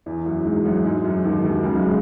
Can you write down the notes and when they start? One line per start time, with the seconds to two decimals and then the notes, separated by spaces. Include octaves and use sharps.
0.06 E2 E3
0.25 F#2 F#3
0.45 G#2 G#3
0.64 F#2 F#3
0.85 G#2 G#3
1.04 F#2 F#3
1.24 D#2 D#3
1.44 D#2 D#3
1.63 C#2 C#3
1.73 F#2 F#3
1.83 G#3